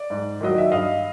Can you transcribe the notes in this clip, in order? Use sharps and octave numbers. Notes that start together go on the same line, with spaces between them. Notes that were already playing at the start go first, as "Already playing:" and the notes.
Already playing: D5
G#2
D#3 F#3 D#5
E5
G2 D#5 F5